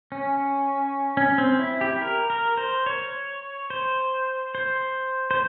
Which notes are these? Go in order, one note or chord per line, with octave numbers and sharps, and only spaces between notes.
C#4
C#4
C4
E4
G4
A#4
A#4
C5
C#5
C5
C5
C5